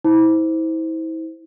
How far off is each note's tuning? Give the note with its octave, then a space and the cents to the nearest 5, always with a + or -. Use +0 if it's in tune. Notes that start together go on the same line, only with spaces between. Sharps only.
E4 -35 C5 -5